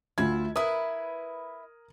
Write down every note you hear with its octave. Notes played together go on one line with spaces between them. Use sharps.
D2 E4 F4 G#6
E4 A#4 B4 D#6